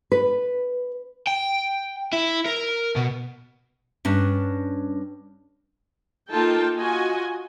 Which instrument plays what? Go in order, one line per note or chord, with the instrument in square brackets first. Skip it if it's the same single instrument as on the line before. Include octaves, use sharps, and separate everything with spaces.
[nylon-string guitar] B4
[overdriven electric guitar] G5
E4
A#4
B2
[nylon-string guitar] G2 C#4 D4
[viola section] A#3 D#4 F4 A4 G5 A5
F4 F#4 D#5 G#5